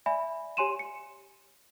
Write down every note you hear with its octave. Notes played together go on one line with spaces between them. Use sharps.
D5 E5 G#5 B5
G4 C#5 G#5 C6 D#7 E7
C#7